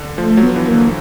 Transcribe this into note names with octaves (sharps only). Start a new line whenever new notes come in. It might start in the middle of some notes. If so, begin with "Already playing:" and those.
Already playing: D3
F3 A3
F#3
B3
E3
A#3
D3